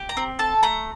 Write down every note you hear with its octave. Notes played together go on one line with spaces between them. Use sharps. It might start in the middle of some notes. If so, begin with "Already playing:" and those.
Already playing: G4
A#5
C4
A4 A5
A3 A#5